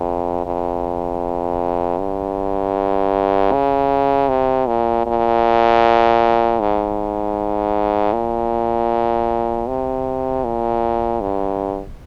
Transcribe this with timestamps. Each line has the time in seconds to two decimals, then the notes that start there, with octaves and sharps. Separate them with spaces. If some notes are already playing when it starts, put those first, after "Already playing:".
Already playing: F2
0.45 F2
1.98 G2
3.52 C#3
4.29 C3
4.67 A#2
5.06 A#2
6.60 G#2
8.13 A#2
9.67 C3
10.44 A#2
11.21 G2